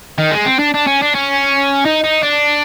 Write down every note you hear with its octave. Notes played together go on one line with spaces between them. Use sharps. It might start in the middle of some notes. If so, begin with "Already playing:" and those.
D#3
G#3
C4
D4
D4
C#4
D4
C#4
D#4
D#4
D4